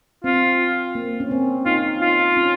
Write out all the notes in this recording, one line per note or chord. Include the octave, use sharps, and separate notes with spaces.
C4 F4
A#3
C#4
C4
D#4 F4
F4
C#4